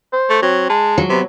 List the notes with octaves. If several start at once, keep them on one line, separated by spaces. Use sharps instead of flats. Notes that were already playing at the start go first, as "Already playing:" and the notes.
C5
A3
F#3 C4
G#3 A5
F#3
C3 B3